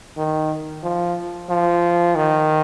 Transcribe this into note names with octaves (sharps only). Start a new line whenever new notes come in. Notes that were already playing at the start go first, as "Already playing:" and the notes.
D#3
F3
F3
D#3